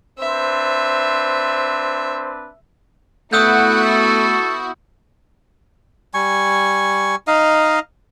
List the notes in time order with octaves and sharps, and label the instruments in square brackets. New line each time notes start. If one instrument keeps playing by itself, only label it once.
[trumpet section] C4 D4 B4 [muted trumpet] C5 [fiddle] E5
[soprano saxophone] A3 [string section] B3 E4 F#4 [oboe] F#5 [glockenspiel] D#6 E6 G6
[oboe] A4
[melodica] G3 G#5 C#6
D#4 D#5 F5